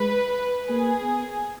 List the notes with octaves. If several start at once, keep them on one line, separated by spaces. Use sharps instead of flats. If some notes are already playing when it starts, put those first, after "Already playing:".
Already playing: G#3 B4
A#3 G#4
B3